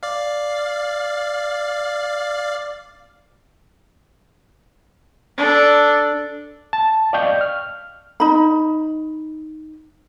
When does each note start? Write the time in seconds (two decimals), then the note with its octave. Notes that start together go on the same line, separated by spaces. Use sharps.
0.03 D5 F5
5.37 D4 A4
6.73 A5
7.13 D5 D#5 F5 G5 C#6 G6
7.41 F6
8.20 D#4 B5